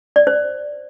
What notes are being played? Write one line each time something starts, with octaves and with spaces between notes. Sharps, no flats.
D5
C5